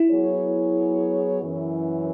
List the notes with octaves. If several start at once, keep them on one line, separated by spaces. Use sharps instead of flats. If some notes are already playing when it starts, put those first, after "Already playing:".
Already playing: E4
F#3 B3 G#4 C#5
F#2 E3 C#4